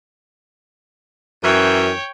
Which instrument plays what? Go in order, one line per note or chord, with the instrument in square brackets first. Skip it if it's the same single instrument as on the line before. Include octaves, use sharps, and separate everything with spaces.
[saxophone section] F#2 [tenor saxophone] E3 [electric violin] C#5 G5